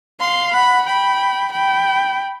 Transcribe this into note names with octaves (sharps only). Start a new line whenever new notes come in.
F5 C6
F#5 B5
G5 B5
G5 B5